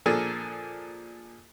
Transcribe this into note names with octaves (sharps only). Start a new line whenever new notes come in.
A#2 F3 A#3 D4 G#4 A4